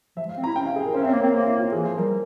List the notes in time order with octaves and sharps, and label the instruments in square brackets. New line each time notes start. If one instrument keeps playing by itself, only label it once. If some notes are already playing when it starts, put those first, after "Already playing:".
[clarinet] F3 [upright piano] E5
[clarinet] G#3
[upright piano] F5
[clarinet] C4
[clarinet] E4 [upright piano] A#5
[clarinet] C#4 [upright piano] G5
[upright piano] F5
G#4
A#4
[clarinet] C#4 [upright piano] C5
[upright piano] E5
[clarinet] C4 [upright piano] C#5
[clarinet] A#3
[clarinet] C4 [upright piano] A#4
[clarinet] A#3 [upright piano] C5
[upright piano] E4
F4
[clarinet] E3 [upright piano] G#4
[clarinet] F3 [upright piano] C5
[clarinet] G3 [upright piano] A#4